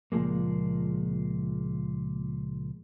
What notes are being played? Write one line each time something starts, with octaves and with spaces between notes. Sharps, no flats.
C#2 A#2 F3 G#3 A#3